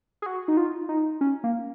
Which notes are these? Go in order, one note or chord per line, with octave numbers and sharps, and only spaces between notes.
G#4
F#4
D#4
F4
D#4
C#4
A#3